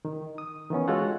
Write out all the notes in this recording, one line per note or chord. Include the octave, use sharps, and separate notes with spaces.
D#3
D#6
D#3 E3 B3 C#4
G#3 F4 F#4 A4 C#5 F#5